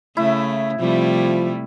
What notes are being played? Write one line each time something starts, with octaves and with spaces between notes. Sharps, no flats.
C#3 A3 E4
C3 F3 G3 A3